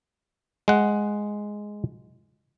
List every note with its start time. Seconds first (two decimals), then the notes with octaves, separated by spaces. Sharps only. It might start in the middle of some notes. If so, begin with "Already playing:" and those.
0.68 G#3 F#5